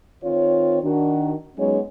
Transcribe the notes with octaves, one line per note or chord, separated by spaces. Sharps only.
D#3 C4 F4 C#5
D#3 D4 F#4
F#3 G#3 B3 C#4 D#4 C#5